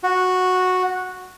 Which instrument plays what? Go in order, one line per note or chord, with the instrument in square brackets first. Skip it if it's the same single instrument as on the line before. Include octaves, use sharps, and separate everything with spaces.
[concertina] F#4